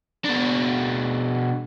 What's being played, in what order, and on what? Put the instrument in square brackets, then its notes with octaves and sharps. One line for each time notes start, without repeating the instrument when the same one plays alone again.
[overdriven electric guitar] B2 D4